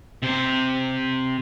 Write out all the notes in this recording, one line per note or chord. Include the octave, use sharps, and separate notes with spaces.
C3 C5